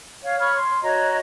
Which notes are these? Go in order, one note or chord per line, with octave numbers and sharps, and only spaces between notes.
C#5 F5
C#5 B5 C#6 F6
C6
F#4 C#5 D#5 A#5